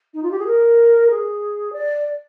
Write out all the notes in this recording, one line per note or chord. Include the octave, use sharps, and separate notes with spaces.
D#4
F4
G4
G#4
A#4
G#4
D5